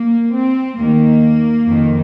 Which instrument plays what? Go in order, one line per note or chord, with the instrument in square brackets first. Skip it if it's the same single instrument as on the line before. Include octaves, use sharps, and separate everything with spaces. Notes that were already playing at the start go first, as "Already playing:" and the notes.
Already playing: [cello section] A#3
C4
D#2 D#3 A#3
F2 D#3